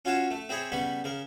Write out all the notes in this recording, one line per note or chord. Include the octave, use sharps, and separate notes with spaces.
C#4 F4 F#4 C#5 F5 A5
A3
C4 E4 G#4 C#5
C#3 G3 B3 B5 C#6
C#3 A#4